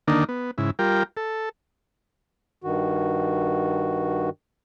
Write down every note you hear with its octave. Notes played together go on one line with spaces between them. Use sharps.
D3 D#3 A#3 D4 D#4
B3
G#2 C#3 E4
G3 F4 A#4 G5
A4
G2 D#3 F#4